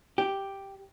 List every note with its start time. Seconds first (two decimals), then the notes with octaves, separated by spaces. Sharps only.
0.18 G4